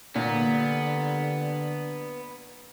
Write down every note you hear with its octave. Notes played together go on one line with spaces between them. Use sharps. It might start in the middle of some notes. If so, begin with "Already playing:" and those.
A#2 D3 G3 B3 D4